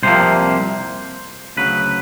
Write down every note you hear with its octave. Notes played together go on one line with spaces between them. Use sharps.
C2 C3 F3 A#3 C5
D2 C#3 F#3 B4